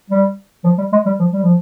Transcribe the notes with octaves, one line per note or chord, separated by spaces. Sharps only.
G3
F3
G3
G#3
G3
F3
G3
F3